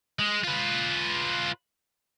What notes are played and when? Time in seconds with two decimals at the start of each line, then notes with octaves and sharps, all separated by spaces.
0.19 G#3
0.43 F4 B4